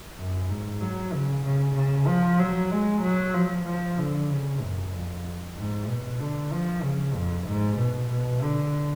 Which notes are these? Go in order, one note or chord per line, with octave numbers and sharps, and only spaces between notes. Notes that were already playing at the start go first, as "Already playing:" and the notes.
F#2
G#2
F#3
C#3
C#3
C#3
F3
F#3
G#3
F#3
F3
F3
D3
C#3
F#2
F2
G#2
B2
D3
F3
C#3
F2
G#2
B2
B2
D3